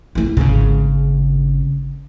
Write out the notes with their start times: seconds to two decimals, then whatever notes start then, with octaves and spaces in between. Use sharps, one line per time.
0.15 E3 E4
0.37 G#1 C#3